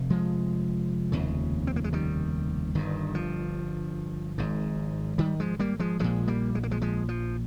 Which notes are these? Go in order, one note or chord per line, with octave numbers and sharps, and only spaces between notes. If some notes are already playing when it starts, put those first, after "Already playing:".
Already playing: F1 C3
F3 G#3
F1 D#2 C#3
C4
A#3
G#3
D#3 G3
G1 G2 D#3
F3
G#1 G#2
D#3 G3
F3 G#3
G3 A#3
F3 G#3
A#1 A#2 F3 G#3
G3 A#3
G#3
A#3
F3 G#3
F3 G#3
F3